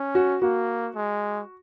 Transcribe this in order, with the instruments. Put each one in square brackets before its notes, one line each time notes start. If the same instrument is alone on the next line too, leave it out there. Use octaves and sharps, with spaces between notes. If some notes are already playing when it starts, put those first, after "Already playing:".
Already playing: [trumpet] C#4
[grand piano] F#4
[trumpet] A#3 [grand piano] F#4
[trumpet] G#3